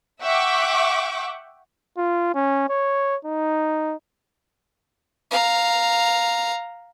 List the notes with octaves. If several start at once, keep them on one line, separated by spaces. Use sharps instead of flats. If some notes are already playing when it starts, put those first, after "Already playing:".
E5 F#5 G5 C#6 D6
F4
C#4
C#5
D#4
F5 A#5